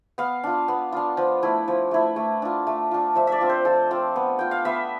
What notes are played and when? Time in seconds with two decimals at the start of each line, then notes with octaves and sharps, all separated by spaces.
0.18 B3 F5
0.44 D4 F4
0.68 B3
0.92 D4 F4
1.17 F3
1.43 A3 E4
1.68 F3
1.91 A3 E4
2.16 A3
2.42 D4 F4
2.67 A3
2.91 D4 F4
3.15 F3 E5
3.27 D5 E5
3.41 C4 F4
3.49 C5
3.65 F3 A4
3.91 C4 F4
4.16 B3
4.39 F4 G5
4.51 F5
4.65 B3 E5